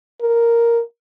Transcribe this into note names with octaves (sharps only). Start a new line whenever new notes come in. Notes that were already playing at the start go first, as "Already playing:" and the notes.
A#4